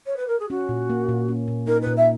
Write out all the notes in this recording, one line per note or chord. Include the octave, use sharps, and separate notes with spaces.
C#5
B4
A#4
G#4
C#4 F#4
A#2
A#3
A#2
C#4
A#2
D#4 A#4
A#2 B4
E5